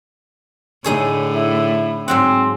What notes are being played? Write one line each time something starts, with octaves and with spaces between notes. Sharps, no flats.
A2 D3 D#4 G#4 C#5
E4
G#2 F#3 C4 F#5